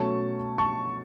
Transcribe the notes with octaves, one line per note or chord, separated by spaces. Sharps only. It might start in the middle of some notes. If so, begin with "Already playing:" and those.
Already playing: B2 F#3 A3 C#4 A5 C#6
A5 C#6